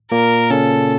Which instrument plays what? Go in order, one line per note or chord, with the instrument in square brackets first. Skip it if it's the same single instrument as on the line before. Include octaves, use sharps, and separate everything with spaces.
[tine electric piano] A#2 A#3 [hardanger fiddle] A#4
[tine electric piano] C#3 C#4 [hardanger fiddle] A4